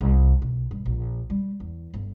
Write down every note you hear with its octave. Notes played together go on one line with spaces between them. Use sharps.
C2
B1
G2
A#1
G3
E2
G1